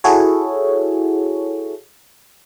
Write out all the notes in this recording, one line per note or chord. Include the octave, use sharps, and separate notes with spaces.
E4 F#4 G#4 A4 C#5